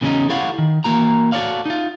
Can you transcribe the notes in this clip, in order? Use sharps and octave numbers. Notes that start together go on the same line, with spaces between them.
E2 C#3 F#3 B3 C#4 D#4
E4 G4 A4 C#5 F5 F#5
D#3
E3 A#3 F#4 A#5
F#4 A4 A#4 C#5 D5 F5
D#4 F4